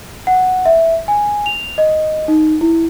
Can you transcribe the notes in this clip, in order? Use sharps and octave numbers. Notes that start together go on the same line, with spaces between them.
F#5
E5
G#5
F7
D#5
D#4
E4